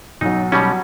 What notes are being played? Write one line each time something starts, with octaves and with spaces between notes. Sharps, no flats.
B1 F#3 D#4
B2 F#3 G3 C#4